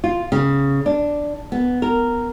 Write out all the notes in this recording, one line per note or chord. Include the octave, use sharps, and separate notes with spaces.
F4
C#3
D4
B3
A#4